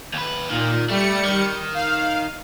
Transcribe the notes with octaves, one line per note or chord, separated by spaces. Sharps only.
D#2 B4
A#2 D#3
G3 A3 C#7
D#3
F5